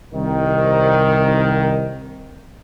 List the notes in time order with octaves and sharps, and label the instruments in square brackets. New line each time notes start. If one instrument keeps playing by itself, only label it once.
[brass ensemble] C2 D#3